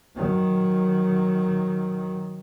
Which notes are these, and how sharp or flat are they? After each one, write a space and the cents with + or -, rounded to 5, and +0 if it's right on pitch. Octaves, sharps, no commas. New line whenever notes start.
D#3 +0 F#3 +0